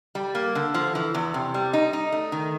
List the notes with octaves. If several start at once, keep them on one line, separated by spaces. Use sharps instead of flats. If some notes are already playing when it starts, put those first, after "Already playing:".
G3
A#3
D3
F3
E3
E2
C3
G3
D#4
D#4
A3
D#3